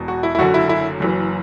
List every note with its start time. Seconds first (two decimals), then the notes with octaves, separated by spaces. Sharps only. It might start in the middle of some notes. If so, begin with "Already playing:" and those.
Already playing: E1 E2 B2
0.08 F#4
0.23 E4
0.35 E4
0.39 F#1 F#2 D3 F#4
0.54 E4
0.69 E4
1.00 F#1 F#2 E3